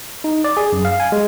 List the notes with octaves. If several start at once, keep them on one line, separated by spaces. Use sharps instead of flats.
D#4
D5
G#4
F#2
F5
G#5
G#3